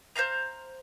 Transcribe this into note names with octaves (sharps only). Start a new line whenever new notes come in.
C5 D#5 F5 A#5